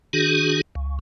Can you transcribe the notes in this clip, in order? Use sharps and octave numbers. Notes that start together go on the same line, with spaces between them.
D#3 D4 F#4 G#4
C#2